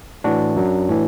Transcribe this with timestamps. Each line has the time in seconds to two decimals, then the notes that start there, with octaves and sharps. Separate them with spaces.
0.24 A2 E3 D4 F#4
0.56 F#2 F#3
0.89 A2 E3